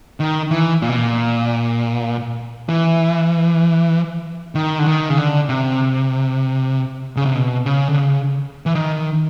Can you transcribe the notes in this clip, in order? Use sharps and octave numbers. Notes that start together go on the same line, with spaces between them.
D#3
E3
A#2
B2
A#2
E3
D#3
D3
D#3
C#3
D3
C3
C#3
C3
B2
C#3
D3
C#3
E3
D#3